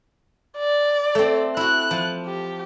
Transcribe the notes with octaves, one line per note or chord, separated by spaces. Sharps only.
D5
A3 C4
E4 F#4 F#6
F3
G4